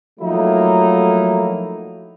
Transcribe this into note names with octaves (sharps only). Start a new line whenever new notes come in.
F3 F#3 A3 A#3 D#4 E4